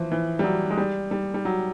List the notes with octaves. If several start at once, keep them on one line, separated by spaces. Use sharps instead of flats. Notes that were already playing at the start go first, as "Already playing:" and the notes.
Already playing: E3 F3
E3
G3
F#3
G#3
G3
G3
G3
F#3